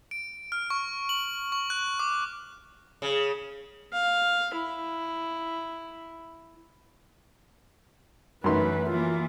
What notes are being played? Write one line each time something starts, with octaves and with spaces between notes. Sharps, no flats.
D7
F6
C#6
F#7
C#6
F#6
D6
C#3
F5
E4
F#2 E3 A3 D#4 B4 C6
E3 A#3 F4